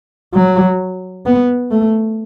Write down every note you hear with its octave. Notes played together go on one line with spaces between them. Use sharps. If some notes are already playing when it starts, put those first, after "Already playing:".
F#3
B3
A3